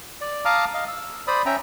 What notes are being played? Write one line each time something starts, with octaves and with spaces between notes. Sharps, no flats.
D5
F5 A5 A#5 D6 D#6 F6
D#5 F5
E6
C5 D5 B5 D#6
C#4 E5 G5 A#5